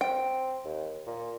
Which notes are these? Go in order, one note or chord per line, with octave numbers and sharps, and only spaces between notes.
C4 G5
D#2
A#2